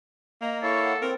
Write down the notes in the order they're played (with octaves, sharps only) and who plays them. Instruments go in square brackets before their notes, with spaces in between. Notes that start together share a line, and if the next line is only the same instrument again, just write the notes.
[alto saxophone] A#3 [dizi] D#5 [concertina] A#5
[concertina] E4 C#5 F5 [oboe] A4 [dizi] C#6
[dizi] F#5
[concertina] C4 [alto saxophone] A#4 [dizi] G5